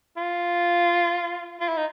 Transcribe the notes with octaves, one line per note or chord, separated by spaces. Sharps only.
F4
F4
E4
D#4